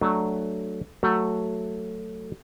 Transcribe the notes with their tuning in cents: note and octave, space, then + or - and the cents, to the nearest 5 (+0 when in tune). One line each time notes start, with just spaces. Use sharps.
F#3 +0 A3 +0 D4 +20
F#3 +0 A3 +10 F#4 +0